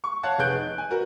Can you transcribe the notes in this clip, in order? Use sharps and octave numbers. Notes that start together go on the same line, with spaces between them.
C#6
C#5 F5 F#5 A5 F#6
F1 G#4 B4 F#6 G6 D7
D#4
G#5
F#4 A#4 B4